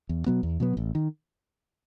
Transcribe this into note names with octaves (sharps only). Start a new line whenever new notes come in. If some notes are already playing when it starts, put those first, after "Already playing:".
E2
B2 F#3 B3
E2
B2 F#3 B3
A1
D#3